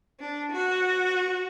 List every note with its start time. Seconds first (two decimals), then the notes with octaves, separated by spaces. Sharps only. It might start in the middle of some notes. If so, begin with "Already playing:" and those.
0.20 D4
0.52 F#4